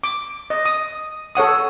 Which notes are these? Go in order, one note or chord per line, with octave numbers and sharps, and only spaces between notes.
D6
D#5
D#6
A4 C#5 F#5 D#6